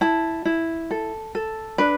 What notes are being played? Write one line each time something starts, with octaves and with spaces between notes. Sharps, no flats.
E4 A5
E4
A4
A4
D4 B4